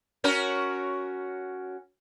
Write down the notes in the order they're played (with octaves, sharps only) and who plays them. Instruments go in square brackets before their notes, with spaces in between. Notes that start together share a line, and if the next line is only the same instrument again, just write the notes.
[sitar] C#4 F#4 A#4